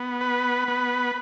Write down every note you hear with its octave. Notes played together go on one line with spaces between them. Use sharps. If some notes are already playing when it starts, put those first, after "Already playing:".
Already playing: B3
B4
B3